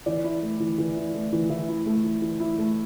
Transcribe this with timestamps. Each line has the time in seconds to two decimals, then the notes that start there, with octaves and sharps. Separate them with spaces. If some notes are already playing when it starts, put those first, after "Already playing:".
0.06 E3 D5
0.24 E4
0.42 A3
0.60 E3
0.78 E3
0.96 E4
1.15 A3
1.32 E3
1.50 E3 E5
1.68 E4
1.86 A3
2.04 E3
2.22 E3
2.40 E4
2.58 A3